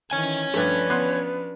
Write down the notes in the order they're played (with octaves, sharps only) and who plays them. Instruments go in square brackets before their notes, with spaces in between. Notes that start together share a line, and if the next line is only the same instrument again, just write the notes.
[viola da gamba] D#3 E3 [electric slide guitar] C#5 G#5
[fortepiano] G2 A3 [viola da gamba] F3 C#4 D4 [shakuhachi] B4
[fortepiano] B3 C6 F#6